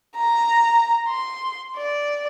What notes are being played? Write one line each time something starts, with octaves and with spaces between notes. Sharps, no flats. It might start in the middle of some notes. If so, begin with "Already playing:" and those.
A#5
C6
D5